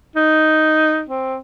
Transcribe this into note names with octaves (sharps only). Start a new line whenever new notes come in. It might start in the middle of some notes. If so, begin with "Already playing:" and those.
D#4
C4